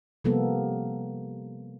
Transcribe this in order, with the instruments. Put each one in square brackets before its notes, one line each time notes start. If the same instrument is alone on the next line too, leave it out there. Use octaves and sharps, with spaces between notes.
[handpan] C3 F3 G3 A#3 B3 A4